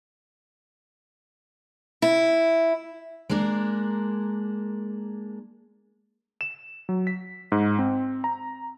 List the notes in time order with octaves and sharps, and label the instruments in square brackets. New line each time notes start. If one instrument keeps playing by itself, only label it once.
[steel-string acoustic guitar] E4
G#3 A#3 D4 A#4
[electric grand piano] E7
F#3
B6
G#2
C4
A#5